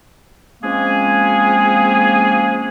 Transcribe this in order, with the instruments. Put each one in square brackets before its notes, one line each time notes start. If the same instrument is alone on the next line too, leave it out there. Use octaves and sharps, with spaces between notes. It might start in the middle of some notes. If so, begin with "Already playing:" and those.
[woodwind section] F3 G#3 A#3 C4 C#4 G#4